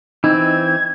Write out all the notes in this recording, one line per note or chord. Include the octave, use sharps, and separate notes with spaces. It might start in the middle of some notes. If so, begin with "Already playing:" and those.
E3 C4 D#4 G#6